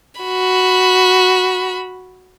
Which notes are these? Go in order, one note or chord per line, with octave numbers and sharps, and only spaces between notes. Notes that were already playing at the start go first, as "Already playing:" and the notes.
F#4 B5